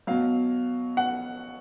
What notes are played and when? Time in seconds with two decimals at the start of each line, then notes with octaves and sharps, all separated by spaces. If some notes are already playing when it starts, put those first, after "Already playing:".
0.07 B2 F#3 F5
0.97 F#5